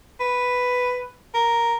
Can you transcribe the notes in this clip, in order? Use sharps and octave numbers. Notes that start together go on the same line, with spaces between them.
B4
A#4